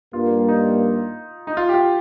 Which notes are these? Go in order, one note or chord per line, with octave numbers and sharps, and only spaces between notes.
G2 G3 A#3 F4
D#4
D#4
F4
G4
F4